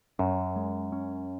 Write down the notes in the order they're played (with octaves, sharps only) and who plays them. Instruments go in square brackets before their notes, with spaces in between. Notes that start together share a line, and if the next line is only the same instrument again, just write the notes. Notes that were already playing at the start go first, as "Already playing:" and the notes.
[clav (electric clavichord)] F#2 [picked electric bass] C#4
[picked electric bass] G#3
C#4